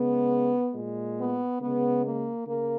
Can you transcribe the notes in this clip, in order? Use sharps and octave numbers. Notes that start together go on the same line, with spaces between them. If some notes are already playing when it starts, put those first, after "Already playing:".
Already playing: C#3 G#3 B3
A#2 G#3
B3
C#3 G#3 B3
A#3
C#3 A#3